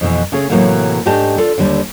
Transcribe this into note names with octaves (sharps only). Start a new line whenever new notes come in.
F2 B2 E3
C#3 A3 C#4 G#4
A2 C3 E3 F#3 A3 A#3
G#2 A3 D4 G4 D#5 A5
F4 A4 D5
D#2 D3 G3 D5